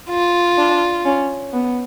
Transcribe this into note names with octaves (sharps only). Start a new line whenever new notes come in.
F4
D4
C#4
B3